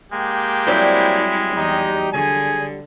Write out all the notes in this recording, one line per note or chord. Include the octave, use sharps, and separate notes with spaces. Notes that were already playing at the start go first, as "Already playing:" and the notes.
G#3 A#3 G4 G5
F#3 G3 C4 E4
E2 D#4 G4
D3 G#4 G#5